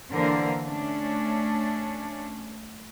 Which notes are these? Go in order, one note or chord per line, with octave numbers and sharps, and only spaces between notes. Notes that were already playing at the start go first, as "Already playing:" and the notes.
D3 E3 A#3 D4 A#4 C5
A3 C#4 D4